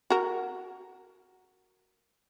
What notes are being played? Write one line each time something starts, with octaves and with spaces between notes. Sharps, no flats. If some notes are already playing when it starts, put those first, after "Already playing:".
F#4 A#4